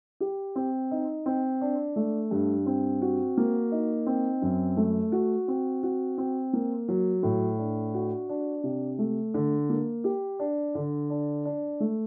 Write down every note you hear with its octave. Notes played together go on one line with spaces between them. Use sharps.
G4
C4
D#4
C4
D4
A3
G2
C4
F#4
A#3
D#4
C4
F#2
A3
F#4
C4
F#4
C4
A#3
F#3
A2
D4
F#4
D4
C3
A3
D3
A#3
G4
D4
D3
D4
D4
A3